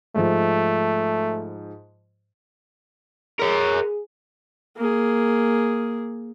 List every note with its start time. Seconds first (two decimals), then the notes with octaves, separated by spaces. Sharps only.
0.16 G#2 F3 A3
3.40 G#4 A#4 C#5
4.77 A#3 G#4